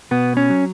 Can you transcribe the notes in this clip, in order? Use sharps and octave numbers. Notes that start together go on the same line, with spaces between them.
B2 B3
C#4
F#3